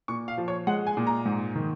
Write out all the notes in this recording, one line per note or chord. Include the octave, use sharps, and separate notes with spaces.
A#2 C#6
F5
F3
C#5
G#3 F#5
G#5
A#2
A#5
G#2
D#3